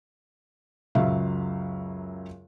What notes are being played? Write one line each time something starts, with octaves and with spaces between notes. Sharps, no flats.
C#2 F#2 C#3 F#3 E5 F5